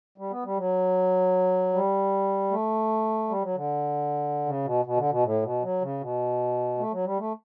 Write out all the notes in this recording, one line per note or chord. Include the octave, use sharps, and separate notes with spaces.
G3
B3
G3
F#3
G3
A3
G3
F#3
D3
C#3
B2
B2
D3
B2
A2
B2
F#3
C#3
B2
A3
F#3
G3
A3